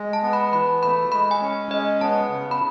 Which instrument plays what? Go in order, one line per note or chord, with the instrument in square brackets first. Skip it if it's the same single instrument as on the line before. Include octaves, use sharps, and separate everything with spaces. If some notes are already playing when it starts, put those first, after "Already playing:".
Already playing: [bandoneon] G#3
[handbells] A5
[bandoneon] B3
[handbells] B5
[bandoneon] E3 [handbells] B5
[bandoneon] A3 [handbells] B5
[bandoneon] G#3 [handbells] B5
[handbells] G#5
[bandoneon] C#4
[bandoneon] G#3 [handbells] D#5
[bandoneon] B3 [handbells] A5
[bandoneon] C#3
[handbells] B5